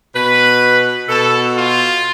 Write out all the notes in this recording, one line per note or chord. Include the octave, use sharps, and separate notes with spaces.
B2 B4
B2 A4
F4